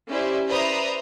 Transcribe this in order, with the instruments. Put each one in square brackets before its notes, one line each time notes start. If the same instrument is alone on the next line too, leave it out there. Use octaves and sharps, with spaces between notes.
[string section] C#4 E4 G4 C5 D5 E5
B4 C5 D5 E5 A#5 D#6